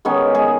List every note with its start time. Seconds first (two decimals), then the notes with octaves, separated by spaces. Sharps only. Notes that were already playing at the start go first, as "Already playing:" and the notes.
0.05 D#3 G#3 B3 C#4
0.35 G#3 G#4